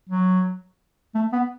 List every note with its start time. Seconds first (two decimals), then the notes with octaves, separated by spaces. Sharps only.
0.09 F#3
1.15 A3
1.33 B3